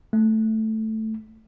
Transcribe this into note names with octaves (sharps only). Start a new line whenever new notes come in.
A3